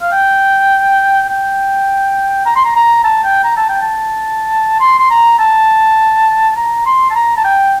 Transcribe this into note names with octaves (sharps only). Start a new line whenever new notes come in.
F5
G5
G5
A#5
C6
A#5
A#5
A5
G5
A#5
A5
G5
A5
C6
C6
A#5
A5
A#5
C6
A5
A#5
A5
G5